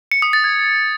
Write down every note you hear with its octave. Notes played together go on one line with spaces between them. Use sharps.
C#7
D#6
A6
G#6